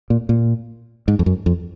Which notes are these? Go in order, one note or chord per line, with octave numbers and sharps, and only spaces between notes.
A#2
A#2
G#2
F2
F#2
F2